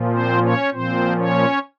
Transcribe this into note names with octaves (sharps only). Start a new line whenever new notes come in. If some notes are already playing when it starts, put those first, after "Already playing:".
Already playing: A#2 F3
C4 C5
C#4 C#5
A#2 F3 C4 C5
C#4 C#5